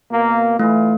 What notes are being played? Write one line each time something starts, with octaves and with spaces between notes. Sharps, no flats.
B2 A#3
E3 A3 E4 F4